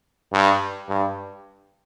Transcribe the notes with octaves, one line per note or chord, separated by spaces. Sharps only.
G2
G2